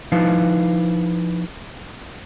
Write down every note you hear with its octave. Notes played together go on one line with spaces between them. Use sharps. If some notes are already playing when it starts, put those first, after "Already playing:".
F3 D#4 E4 B4 F5 A5